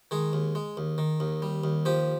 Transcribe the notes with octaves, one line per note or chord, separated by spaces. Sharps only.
D#3 G#3 G#4
D#2
G#3
D#2
D#3
D#2
G3
D#2
F3 G4